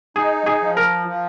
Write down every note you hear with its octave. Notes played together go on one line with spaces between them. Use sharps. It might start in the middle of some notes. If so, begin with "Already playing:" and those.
D#4 G#4
G#4
F3
A#4
F3